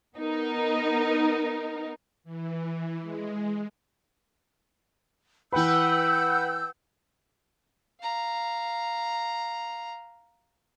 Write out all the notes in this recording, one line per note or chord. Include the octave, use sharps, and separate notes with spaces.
B3 D#4 A#4
E3
G#3
E3 B4 F#5 G5 B5 E6 G6
F5 A#5